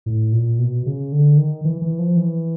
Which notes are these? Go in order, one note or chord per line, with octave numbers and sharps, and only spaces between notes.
A2
A#2
B2
C#3
D3
D#3
E3
E3
F3
E3